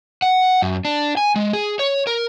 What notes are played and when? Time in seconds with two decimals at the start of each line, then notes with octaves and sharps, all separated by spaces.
0.22 F#5
0.62 F#2
0.85 D4
1.17 G#5
1.36 G#3
1.53 G#4
1.79 C#5
2.07 A#4